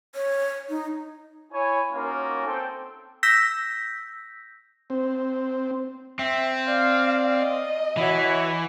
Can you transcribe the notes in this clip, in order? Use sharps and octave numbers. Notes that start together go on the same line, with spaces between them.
C#5
D#4
E4 C#5 G#5
A#3 C#4 D#4 F4 F#4 A#4
C4 A4 G5
E6 G6 A#6 B6
C4
C4 E5
D5 F5
D#5
E3 E4 F#4 C#5 E5